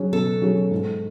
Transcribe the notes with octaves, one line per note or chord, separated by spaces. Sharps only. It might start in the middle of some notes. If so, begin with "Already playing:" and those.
Already playing: F#3 C#4 G#4
B2 A4
F#3 C#4 G#4
G#2